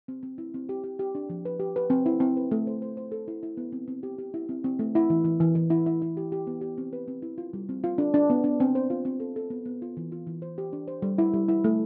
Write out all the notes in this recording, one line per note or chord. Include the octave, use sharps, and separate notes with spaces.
C4
C4
E4
C4
G4
G4
G4
D4
F3
B4
G4
B4
C4
E4
C4
B4
A3
C5
C5
C5
A4
E4
E4
B3
C4
C4
G4
G4
E4
C4
C4
A3
E4
E3
E3
E3
E3
E4
E4
E4
G4
G4
B3
G4
C4
B4
C4
E4
F4
G3
C4
F4
D4
D4
B3
D4
C4
C5
F4
C4
A4
A4
B3
B3
F4
E3
F4
E3
C5
G4
D4
C5
G3
E4
G3
E4
A3